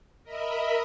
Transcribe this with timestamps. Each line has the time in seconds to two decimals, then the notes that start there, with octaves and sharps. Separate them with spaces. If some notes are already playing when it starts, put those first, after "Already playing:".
0.24 A#4 D#5 E5 B5